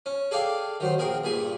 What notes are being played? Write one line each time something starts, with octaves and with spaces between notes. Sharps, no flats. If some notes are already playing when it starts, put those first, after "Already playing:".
C#4
G#4 A4 D5 F5 G5
D#3 F#3 C5
A#1 G#4 A#4 G5
G2 A#2 G#4 G#5